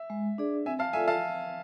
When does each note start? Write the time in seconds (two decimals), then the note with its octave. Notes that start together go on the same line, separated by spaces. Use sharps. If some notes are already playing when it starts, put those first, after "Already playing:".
Already playing: E5
0.10 G#3
0.38 D4 G#4 D5
0.65 C4 E5 G#5
0.79 F5 A5
0.93 F4 A4 D5 E5 G#5
1.08 F5 A5